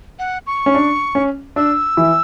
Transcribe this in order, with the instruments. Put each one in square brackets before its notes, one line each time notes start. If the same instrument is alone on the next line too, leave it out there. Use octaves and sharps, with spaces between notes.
[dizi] F#5
C#6
[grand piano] C#4
D4
C#4
[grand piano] D4 [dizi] E6
[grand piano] E3 E4